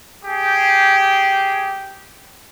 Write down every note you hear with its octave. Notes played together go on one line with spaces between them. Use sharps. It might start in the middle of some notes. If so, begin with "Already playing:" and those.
G4 G#4